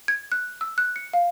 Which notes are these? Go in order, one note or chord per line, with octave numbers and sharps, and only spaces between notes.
G#6
F#6
E6
F#6
C#7
F5